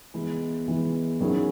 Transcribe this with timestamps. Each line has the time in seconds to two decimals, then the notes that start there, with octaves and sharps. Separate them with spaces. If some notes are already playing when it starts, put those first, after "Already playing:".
0.14 E3 G#3 B3 E4
0.68 E3 G#3 B3 E4
1.21 D#3 F#3 C#4 E4 G#4